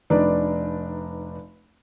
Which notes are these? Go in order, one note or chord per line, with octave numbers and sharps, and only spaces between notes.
F1 D4 D#4 B4 D5